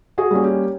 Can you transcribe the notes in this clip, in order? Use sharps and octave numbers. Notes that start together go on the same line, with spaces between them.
F#4 G#4
G3 A#3 C#4
G4